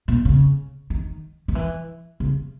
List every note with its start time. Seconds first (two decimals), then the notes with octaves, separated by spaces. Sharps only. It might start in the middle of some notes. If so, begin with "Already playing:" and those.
0.08 A#2
0.25 C#3
0.90 D#3
1.48 D#3
1.55 E3
2.20 C#3